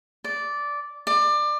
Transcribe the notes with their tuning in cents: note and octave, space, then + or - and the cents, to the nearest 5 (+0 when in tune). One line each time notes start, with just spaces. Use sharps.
D5 -10
D5 +25